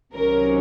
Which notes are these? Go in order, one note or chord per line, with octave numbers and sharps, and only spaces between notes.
C2 C3 D#3 F#3 C#4 A#4